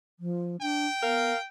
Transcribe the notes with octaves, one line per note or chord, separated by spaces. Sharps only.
F3
D4 G5
B3 A#4 F5